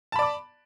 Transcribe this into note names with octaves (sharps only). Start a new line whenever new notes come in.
D5 A5 B5 D6